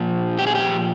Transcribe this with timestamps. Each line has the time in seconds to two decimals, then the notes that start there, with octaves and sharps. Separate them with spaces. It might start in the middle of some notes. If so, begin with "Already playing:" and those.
Already playing: A#2 F3
0.39 G4
0.47 G#4
0.55 G4